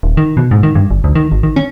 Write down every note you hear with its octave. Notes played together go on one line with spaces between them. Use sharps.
D#1
D#3
B2
G#2
D#3
G2
G1
D2
D#3
G#1
D#3
C#4